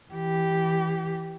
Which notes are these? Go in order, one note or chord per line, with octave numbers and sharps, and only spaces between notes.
E3 G4